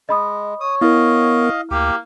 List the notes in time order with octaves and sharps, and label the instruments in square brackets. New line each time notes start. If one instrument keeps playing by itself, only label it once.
[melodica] G#3 [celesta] D#5 B5 D#6
[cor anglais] C#5 [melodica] D#6
[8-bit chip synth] B3 A#4 [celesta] E4 [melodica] D#5 F5
[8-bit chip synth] D2 [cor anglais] A#3 [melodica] G4